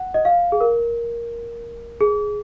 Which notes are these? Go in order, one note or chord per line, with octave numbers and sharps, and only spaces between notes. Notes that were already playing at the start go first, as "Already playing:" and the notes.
Already playing: F#5
D#5
F5
G#4
A#4
G#4